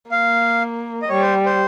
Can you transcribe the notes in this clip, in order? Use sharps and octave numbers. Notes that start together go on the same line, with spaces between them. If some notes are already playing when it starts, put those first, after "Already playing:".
A#3 F5
D#5
G3 C#5
C5
C5